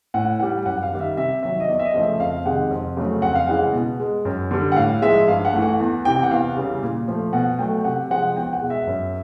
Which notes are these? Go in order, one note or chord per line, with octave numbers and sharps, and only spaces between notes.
A2 F#5
E3 G3 F#5
F#2 F#5
F5
D#3 G3
E5
C3 E5
D#3 F#3 E5
D#5
E2 D5
E5
D#5
C#3 F3 A3
E5
F2 F5
C3 D#3 G#3 F#5
F2
C#3 F#3 A3
F2 F#5
F5
C#3 E3 G#3 F#5
B2
G#3
F#2
D3 G3
F#5
A2 F5
F3 G#3 E5
G2 F5
F#5
E3 A3
F#5
E2
C3 E3 G5
F#5
E2 F5
C#3 E3 G3
A#2
F3 A3
B2 F#5
F#3 A3 G5
C3 F#5
F3 G#3 F#5
E2 G5
F#5
B2 G#3
E5
F#2